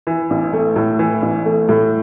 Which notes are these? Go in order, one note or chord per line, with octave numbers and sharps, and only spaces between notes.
E3
A1
A3
A2
E3
A1
A3
A2